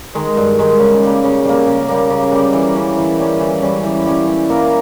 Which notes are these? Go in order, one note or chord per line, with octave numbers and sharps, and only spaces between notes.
D#3 G#3
G2
D#3 G#3
C#3
G3 A#3
C#3
G3 A#3
C#3
G3 A#3
C#3
G3 A#3
E3
G3 C#4
E3
G3 C#4
E3
G3 C#4
E3
G3 C#4
G3
A#3 E4 A#4